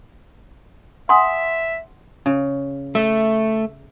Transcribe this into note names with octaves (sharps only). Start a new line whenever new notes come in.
E5 F#5 G#5 C6 D#6
C#3
A3 E5